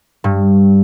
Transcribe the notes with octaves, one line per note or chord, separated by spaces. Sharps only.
G2